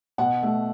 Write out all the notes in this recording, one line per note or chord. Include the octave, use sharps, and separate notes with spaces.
B2 F#5
A3